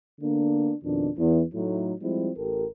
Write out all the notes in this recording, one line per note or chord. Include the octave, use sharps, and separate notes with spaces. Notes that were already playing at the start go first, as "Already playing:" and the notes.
D3 A#3 B3 D4
F2 B2 D#3 D4
E2
A2 F#3 A3 D#4 E4
F3 G3 G#3 C4 E4
A1 G4 A4 A#4